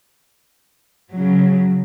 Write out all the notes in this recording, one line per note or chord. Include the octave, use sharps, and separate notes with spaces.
C#3 F#3